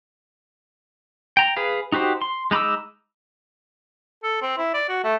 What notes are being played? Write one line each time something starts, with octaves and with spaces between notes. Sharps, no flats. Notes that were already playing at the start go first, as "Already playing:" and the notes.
G5 A#5
G#4 B4 F5
D#4 F#4 G4 C5
C6
G#3 D#4 B5 D6 E6
A4
C4
E4
D5
F#4
A3